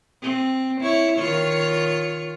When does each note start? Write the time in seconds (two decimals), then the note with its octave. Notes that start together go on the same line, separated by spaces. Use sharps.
0.22 C4
0.81 E4 C#5
1.17 D#3 F4 C#5